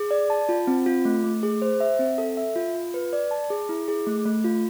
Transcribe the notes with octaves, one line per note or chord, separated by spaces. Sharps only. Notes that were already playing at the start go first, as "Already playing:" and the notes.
Already playing: G#4
D5
A5
F4
C4
F4
A3
A3
G#4
C5
E5
C4
A4
E5
F4
F4
B4
D5
A5
G#4
E4
G#4
A3
A3
F4